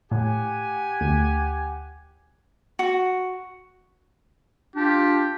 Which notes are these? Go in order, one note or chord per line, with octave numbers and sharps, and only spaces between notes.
A2 G4 F#5 G#5
D2
F#4
D4 F4 G4